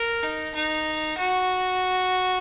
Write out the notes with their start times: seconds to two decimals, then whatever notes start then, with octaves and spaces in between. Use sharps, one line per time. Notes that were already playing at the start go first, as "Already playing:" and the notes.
Already playing: A#4
0.23 D#4
0.55 D#4
1.18 F#4